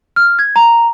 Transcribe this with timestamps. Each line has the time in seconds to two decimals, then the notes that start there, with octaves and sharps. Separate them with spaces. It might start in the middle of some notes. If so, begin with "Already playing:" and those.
0.16 F6
0.39 G#6
0.56 A#5